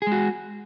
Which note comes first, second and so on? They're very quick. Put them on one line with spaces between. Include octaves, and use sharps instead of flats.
G#4 G#3 F#4